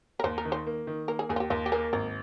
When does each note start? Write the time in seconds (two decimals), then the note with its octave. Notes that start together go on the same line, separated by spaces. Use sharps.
0.20 A#4
0.24 D#2 C5
0.38 A#4
0.45 D#3
0.52 C5
0.67 A#3
0.87 D#3
1.08 A#3 A#4
1.19 G#4
1.29 D#2 G#4
1.36 F4
1.40 G4
1.50 D#2 F4
1.66 G4
1.72 A#3 G#4
1.93 G#1 A#4